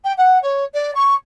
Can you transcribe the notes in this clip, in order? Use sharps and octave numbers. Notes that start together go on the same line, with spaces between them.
G5
F#5
C#5
D5
C#6